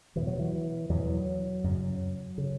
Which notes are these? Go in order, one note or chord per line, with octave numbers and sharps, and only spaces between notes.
E2 B2 E3
F#3
E3
E2 B2 F#3
F#2 C#3
C#3